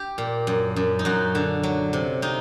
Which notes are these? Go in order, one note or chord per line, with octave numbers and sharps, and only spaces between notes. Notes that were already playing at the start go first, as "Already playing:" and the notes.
Already playing: G4
A#2
F#2
F#2
D#4
F#2 F#4
D3
F#3
C3
C3 D#4